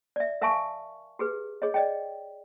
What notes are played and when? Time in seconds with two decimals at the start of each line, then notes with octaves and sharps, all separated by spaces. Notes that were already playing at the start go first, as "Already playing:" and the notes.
0.16 D5 E5
0.41 A#4 E5 F5 G#5 A5 C#6
1.19 G4 G#4 B4
1.62 G#4 C#5 D#5
1.74 D5 D#5 G5